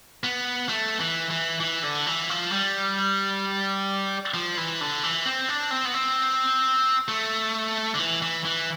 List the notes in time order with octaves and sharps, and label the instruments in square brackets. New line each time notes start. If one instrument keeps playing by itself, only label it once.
[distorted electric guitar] B3
A3
E3
E3
E3
D3
E3
F3
G3
F3
E3
D3
E3
C4
D4
C4
B3
C4
A3
D3
E3
E3
E3